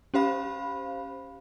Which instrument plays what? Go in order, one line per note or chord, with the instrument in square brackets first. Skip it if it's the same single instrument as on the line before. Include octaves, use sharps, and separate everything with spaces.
[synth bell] C#4 G4 C5 F5 B5